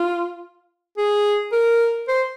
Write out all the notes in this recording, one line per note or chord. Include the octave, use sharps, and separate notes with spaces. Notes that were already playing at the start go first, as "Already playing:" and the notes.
Already playing: F4
G#4
A#4
C5